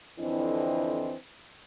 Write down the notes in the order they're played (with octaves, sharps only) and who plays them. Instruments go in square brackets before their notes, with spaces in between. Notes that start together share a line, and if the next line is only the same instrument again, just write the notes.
[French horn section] F2 D3 E3 C4 E4 D#5